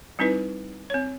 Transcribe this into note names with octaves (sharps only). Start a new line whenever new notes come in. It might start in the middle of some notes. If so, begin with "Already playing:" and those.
G3 C4 D#4 E4 B4
C4 C#5